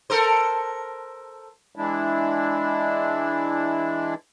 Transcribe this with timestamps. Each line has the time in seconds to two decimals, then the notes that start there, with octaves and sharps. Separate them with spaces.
0.10 A4 A#4 C5
1.76 E3 G#3 D4 E4